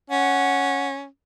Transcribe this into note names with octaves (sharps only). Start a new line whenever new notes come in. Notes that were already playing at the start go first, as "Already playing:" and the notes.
C#4 F#5